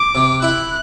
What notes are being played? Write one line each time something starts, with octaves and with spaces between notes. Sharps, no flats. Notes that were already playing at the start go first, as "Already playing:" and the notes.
Already playing: D6
C3
E4 F#6